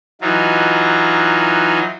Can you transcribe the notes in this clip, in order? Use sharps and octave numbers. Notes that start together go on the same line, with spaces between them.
E3 F#3 D#4 F4